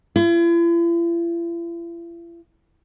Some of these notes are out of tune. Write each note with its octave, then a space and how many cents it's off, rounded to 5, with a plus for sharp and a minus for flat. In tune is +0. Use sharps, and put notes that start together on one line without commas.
E4 +45